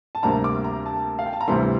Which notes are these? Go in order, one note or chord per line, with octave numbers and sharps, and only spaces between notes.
A5
D2 C3 G3 A#3 D4 A#5
D6
A#5
A5
F5
G5
A5
A#5
D2 C3 E3 G3 C6